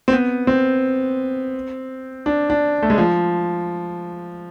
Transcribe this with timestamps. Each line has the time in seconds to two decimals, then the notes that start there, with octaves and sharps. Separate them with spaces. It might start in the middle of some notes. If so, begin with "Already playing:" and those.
0.08 C4
0.12 B3
0.47 C4
2.26 D4
2.50 D4
2.82 A3
2.90 G#3
2.98 F3